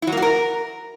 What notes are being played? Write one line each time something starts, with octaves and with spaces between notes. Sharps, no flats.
E4
F#3
A#3
F#4
A#4